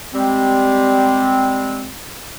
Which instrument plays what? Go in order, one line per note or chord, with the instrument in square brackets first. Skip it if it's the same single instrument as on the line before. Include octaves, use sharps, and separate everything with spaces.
[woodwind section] G3 G#3 C4